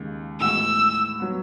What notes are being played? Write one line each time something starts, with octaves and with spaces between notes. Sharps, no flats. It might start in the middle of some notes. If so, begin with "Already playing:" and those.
Already playing: D#2 C#3 G#3
A2 E3 G#3 B3 F#4 E6
F#3 B3